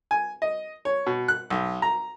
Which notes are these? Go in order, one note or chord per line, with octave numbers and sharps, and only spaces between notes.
G#5
D#5
C#5
B2
F#6
B1
A#5